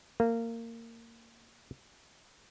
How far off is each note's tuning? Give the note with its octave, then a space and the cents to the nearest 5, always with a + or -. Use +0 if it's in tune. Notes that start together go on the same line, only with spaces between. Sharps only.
A#3 -20